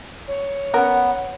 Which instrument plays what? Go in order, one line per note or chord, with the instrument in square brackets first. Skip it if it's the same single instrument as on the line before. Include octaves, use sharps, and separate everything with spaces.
[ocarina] C#5
[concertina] B3 [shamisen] C#4 A#4 [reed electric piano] F#5